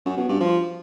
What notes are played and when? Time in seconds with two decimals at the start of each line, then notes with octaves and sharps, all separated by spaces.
0.06 F#2
0.17 B2
0.29 G2
0.40 F3